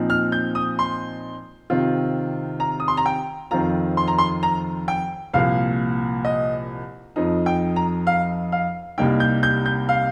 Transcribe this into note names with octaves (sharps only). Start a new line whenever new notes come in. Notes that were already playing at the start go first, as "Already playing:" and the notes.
Already playing: A#2 F3 C4 D#4
F6
G6
D#6
C6
C3 D#3 C4 F4
A#5
D#6
C6
A#5
G5
F2 D#3 C4 F4 A#5
C6
A#5
C6
A#5
G5
C2 A#2 F3 A#3 F5
D#5
F2 F3 D#4
G5
A#5
F5
F5
C2 C3 G3 A#3 D#4 G5
G6
G6
G6
F5